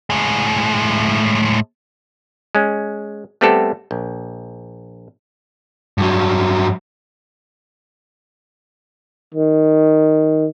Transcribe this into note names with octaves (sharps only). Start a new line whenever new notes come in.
A2 G#3
G#3 C#4
G3 A3 B3 C4 G4 A4
A#1
G2 F#3
D#3